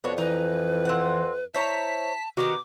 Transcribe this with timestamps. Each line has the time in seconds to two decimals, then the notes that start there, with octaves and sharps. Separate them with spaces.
0.04 F2 B3 D4 F#4 C#5
0.18 E3 D#4 B4
0.85 C4 F#5
1.54 E4 C5 C#5 A5 A#5 B6
2.37 B2 D#3 D#4 F#4 G4 D6